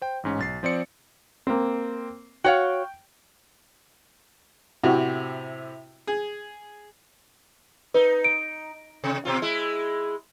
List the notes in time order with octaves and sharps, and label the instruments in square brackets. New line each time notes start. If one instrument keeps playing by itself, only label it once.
[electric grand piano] C5 G5
A1 G#2 C#4
B1 A6 C7
F3 C4 D5 C#7
[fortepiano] A#3 C4
[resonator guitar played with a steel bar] F#4 C#5 F5 [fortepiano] G5
[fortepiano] A2 C3 [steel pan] E4 F#4 G4
[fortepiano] G#4
[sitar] D#4 [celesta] B4
[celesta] D7
[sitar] C3
B2 C4 F4
G#3 E4